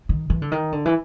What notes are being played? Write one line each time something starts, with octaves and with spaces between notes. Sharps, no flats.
D#3
E3
D3
D#3
D3
E3